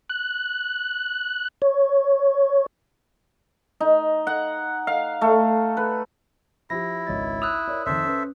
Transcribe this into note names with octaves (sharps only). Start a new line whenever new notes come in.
F#6
C#5
D#4
F#5
F5
A3
B4
F3 E4 G4 A#6
G#1 C#2 C#5 D#5 A6
D#6 E6 F#6 F7
A#4 C#5 D5
F2 D#3 A4 C5 E5
C#4 B4